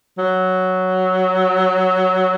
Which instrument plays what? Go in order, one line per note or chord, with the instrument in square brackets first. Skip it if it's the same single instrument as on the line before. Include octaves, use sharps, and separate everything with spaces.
[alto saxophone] F#3